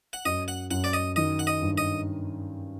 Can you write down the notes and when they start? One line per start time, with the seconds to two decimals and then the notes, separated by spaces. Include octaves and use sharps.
0.13 F#5
0.25 F#2 D#5
0.48 F#5
0.70 F#2 F#5
0.84 D5
0.93 D#5
1.16 D#3 D#5
1.39 F#5
1.47 D#5
1.62 G2
1.78 D#5